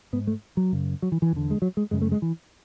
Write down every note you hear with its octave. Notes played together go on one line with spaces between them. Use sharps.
G#2 B3
A3
F#3
F#2 C#3
F#3
E3
E3
E2 D3
G#3
F#3
G#3
F#2 C#3 G#3
A3
G#3
E3